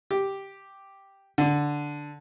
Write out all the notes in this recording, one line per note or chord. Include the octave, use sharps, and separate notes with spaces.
G4
D3